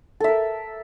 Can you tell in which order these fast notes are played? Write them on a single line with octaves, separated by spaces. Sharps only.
A4 E5 A#4